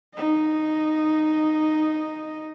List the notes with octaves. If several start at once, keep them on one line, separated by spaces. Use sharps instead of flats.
D#4 D#5